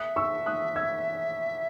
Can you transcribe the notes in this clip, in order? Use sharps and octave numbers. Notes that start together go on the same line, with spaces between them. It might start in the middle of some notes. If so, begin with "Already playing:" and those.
Already playing: E5 D#6 F#6
C#6 E6
D#6 F#6
E6 G#6